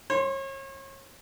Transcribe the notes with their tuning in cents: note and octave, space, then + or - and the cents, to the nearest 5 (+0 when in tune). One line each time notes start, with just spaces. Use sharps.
C#5 -35 C6 +0